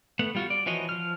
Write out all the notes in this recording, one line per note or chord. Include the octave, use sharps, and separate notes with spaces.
A3 B3 F#5
G3 F4 F#4
D5
E3 F3 F#4 C#5 D#5
F3 F6